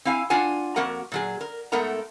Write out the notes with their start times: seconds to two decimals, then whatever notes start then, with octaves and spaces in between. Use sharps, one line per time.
0.05 C4 E4 F5 G#5
0.30 D4 F4 F#5 G#5 A5
0.76 F2 A#3 F#4 A#4 F#5
1.12 A#2 F#3 G#4
1.41 A#4
1.72 G#2 A3 B3 A#4 F#5 A#5